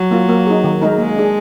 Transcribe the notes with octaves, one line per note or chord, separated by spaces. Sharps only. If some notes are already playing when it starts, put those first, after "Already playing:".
Already playing: F#3
A#3 F4
A#3
D#4 G#4
D#3
G#3 D#4 A#4
G#3 A#3
D4 G#4